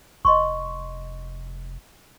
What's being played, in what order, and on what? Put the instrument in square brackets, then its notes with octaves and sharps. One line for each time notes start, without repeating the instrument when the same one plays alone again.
[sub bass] F1 [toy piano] D#5 C6 C#6